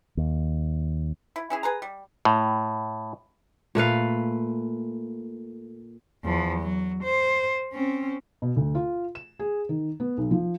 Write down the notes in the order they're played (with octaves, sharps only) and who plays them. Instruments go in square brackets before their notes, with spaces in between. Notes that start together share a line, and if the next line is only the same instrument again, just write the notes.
[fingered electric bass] D#2
[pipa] E4
C#4 E4 G#4
G#4 B4 A#5
G3
[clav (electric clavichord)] A2
[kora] A#2 A3 B4 F5
[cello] E2 F3
F#3
C5
C4 C#4
[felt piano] B2
D2
F4
E7
G#4
D#3
B3
B1
F3